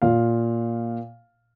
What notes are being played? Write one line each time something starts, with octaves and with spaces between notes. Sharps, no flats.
A#2 F5